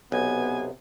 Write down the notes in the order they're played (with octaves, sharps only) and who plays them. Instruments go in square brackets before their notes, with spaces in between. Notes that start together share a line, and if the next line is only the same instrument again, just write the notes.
[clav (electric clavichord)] B1 [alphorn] C3 [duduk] B3 [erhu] G#5